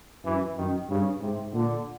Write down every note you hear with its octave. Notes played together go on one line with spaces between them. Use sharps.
F#2 E3
F#2 D#3
G2 C#3
G#2 C3
A#2 D3